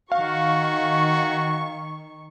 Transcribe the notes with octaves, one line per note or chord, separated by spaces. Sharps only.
D#3 F#4 F5 C#6